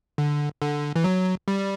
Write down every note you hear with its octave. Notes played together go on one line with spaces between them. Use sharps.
D3
D3
E3
F#3
G3